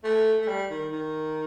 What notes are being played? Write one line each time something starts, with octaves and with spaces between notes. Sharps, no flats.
A3
A3
G3
D#3
D#3